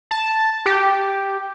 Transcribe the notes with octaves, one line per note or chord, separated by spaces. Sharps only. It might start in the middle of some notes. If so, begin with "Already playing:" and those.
A5
G4